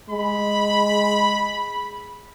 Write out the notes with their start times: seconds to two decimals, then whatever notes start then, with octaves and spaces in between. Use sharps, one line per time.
0.10 G#3 B5